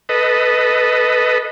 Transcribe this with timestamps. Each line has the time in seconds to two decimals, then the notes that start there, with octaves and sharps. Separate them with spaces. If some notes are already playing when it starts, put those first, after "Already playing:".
0.09 A4 B4 D#5